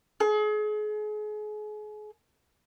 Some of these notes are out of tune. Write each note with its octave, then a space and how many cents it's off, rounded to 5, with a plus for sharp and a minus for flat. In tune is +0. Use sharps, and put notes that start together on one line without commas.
G#4 +35